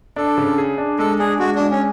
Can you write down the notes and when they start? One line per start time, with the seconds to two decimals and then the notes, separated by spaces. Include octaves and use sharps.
0.16 D4 A4
0.38 C#3
0.58 G#4
0.78 D4
0.99 G#3 A4
1.19 D4 G#4
1.39 G#3 F#4
1.56 G#3 D4
1.71 C#4